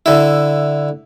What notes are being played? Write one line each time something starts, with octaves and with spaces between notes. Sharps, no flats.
D3 E4